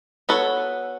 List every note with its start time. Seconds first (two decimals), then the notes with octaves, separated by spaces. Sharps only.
0.29 B3 F#4 A4 C#5